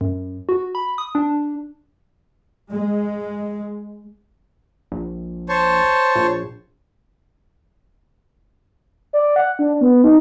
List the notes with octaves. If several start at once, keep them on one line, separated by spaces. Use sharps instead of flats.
F#2
F#4
B5
D#6
D4
G#3
A#1
C5 C#5 A5
A#1
D5
F#5
D4
B3
D#4